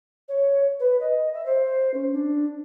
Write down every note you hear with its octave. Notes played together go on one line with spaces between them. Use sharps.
C#5
B4
D#5
E5
C5
C#4
D4